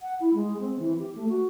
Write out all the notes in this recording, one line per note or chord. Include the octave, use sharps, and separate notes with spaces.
F#5
E4
G#3
C4
E3
G4
A3
F#4